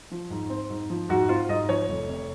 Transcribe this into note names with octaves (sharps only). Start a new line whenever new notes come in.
F3
G#2
C4
G#2
F3
G#2 F#4
C4 F4
G#2 D#5
F3 C#5
F1
C3